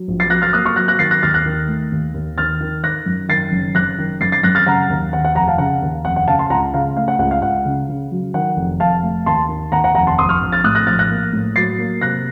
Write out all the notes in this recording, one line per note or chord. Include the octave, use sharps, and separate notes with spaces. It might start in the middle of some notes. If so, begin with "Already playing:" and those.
Already playing: F#3
A#1
A6 C7
F#3 F#6 A#6
F6 A6
A#3 D#6 F#6
C#6 F6
F#3 F#6 A#6
F#6 A#6
D#3 A6 C7
F#6 A#6
D#2 F6 A6
F#6 A#6
D#3
A3
D#2
D#2
D#3 F6 A6
D#3
D#3 F#6 A#6
F#2
D#3 A6 C7
F#1
F#1 F#6 A#6
D#3
F#2 A6 C7
A6 C7
F#2 F#6 A#6
F6 A6
C#3 F#5 A#5
D#2
D#2 F#5
F#5
F1 F#5 A#5
F5 A5
C#3 F#5
D#2
F1 F#5
F#5
C#3 F5 A5
A5 C6
C#2 F#5 A#5
C#3 F5
A3 F5
F#5
C#2 F#5
F5
C#2 F#5
C#3
C#3
F#3
D#3 F#5
F1
F1 F5 A5
A3
D#2 A5 C6
D#3
D#2 F#5 A#5
F#5 A#5
F1 F#5 A#5
A5 C6
A#1 C6 D#6
C#6 F6
A#1
F6 A6
A2 D#6 F#6
F#6 A#6
A#1 F6 A6
F#6 A#6
A#3
A2
F#3 A6 C7
A#3
C3 F#6 A#6